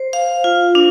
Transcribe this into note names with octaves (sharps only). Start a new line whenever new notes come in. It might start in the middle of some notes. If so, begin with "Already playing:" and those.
Already playing: C5
F5
F4
D4